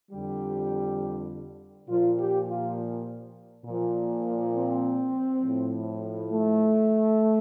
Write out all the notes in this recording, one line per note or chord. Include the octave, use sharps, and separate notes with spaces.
F2 D3 G3 G4
A#2 F3 F4
G4
F4
A#2 F3
C4
A2 F3
A3